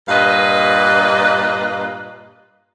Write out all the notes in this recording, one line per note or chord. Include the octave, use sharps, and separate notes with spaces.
G2 A#2 B4 D#5 F5